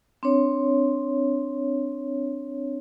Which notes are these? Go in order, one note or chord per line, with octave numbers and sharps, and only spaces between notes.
C4 D4 C#5